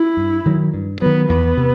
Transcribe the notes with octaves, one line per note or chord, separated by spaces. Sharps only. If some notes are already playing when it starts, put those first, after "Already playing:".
Already playing: E4
G2
D#3 F#3
G2
D#3 F#3 B3
E2 B3
C3